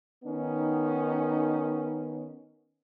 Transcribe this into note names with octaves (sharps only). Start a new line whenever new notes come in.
D#3 B3 C#4 D#4